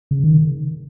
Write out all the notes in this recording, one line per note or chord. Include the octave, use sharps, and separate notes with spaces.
C#3
D#3